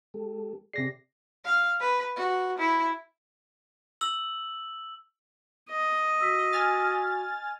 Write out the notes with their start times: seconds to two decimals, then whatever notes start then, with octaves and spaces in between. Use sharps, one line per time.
0.14 G#3 G4 A4
0.73 C3 G#4 D5 A#6 C7
1.45 F5
1.80 B4
2.16 F#4
2.58 E4
4.01 E6 F#7
5.70 D#5
6.21 F#4 E6 B6
6.53 G#5 F6 A6